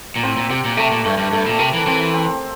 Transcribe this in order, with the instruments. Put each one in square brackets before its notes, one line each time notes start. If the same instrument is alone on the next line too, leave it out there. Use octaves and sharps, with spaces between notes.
[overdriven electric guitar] A#2
[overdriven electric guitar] A2 [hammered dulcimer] C4
[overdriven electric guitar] A#2
[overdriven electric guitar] C3 [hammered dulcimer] G4
[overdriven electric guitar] A#2
[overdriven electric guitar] C3 [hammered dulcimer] A3
[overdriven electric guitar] A#2
[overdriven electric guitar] G2 [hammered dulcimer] A3
[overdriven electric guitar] G2
[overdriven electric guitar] G2 [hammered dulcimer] A3
[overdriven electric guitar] A#2
[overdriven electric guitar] C3 [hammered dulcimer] A#4
[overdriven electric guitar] E3
[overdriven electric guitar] E3 [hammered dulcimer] C4
[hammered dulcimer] C4